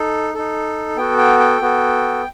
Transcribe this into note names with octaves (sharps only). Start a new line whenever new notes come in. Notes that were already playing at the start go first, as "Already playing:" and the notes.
Already playing: D#4 A4
D#4 A4
B3 F#4 A4 G5
G5
G5
B3 F#4 A4